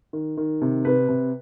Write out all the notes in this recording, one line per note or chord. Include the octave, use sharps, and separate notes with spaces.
D#3
D#3
C3
C3 B4
C3